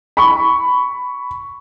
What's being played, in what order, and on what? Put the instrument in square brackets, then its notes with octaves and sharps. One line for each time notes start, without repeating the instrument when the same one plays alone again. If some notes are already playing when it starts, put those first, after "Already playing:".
[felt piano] B5 C#6